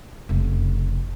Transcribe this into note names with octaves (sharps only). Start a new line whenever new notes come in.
F1 C#3